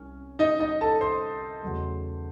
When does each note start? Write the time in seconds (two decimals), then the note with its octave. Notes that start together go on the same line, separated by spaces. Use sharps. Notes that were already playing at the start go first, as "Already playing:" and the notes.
Already playing: C2 C#4
0.39 D#4 D#5
0.60 D#4 D#5
0.81 A4 A5
1.01 C5 C6
1.63 E2 C#3 F#3 A3